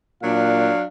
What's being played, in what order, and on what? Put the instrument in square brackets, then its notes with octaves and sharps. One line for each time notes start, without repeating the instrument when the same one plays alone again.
[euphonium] A#2 [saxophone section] F#3 D4 [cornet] F5